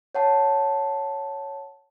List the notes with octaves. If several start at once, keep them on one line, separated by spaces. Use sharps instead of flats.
C#5 F#5 A5